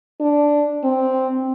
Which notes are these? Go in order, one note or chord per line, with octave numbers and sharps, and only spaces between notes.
D4
C4